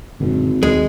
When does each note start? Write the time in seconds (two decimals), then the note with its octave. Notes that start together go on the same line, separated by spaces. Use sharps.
0.20 G#1 F#2 A#2 D3
0.63 D#2 G#3